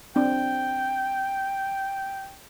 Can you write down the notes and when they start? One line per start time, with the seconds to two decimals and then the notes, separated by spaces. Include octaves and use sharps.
0.16 C4 D4 G5